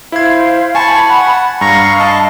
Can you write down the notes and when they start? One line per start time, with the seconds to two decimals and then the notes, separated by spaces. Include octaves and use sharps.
0.12 E4 C5 F5 G#6
0.75 G#5 A5 B5 C#6
1.09 F#5
1.61 G2 F5 A#5 C#6
1.99 D#5 A5